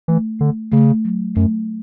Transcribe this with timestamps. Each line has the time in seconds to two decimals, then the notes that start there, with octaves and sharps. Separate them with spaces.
0.08 E3 A3
0.40 D3 A3
0.72 C#3 A3
1.05 F#3
1.35 F#2 A3